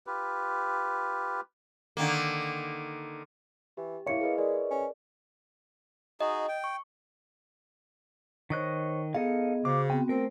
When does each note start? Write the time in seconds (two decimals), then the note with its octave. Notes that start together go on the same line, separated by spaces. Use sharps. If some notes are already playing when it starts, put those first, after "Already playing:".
0.07 F4 G4 B4
1.97 D3 D#3 A#3
3.77 E3 G4
4.07 A#3 E4 C#5 F5 C#7
4.21 G#4 B4 D#5
4.38 G#3 A#4 D5
4.71 C#4
6.21 D#4 F#4 G#4 D#5
6.49 G5
6.64 C#6
8.50 D#3 C5 C#5 D#5 C#6 F#6
9.15 B3 D#4 G#4 A4 D#5 F5
9.65 C#3 F#4 C5 F5 D6
9.90 B3 C4 F#4 G5
10.09 A3 C4 A#4 C5